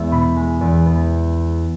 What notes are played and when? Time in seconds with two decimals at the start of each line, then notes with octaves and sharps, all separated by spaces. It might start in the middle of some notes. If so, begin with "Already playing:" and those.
Already playing: E2 G#3 B3 E5
0.11 B2 B5
0.36 G#3
0.61 E2
0.86 B3